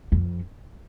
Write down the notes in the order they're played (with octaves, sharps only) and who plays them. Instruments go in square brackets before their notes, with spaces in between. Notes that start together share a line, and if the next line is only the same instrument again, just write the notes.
[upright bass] F2